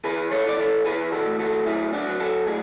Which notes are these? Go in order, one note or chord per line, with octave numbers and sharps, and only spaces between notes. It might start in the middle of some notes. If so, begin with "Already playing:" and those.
E3 G#4 B4
A4 C#5
E3 D5
A4 C#5
E3 G#4 B4
F#4 A4
A2
F#4 A4
F#3 E4 G#4
D4 F#4
F#3
F#4 A4
A2 G#4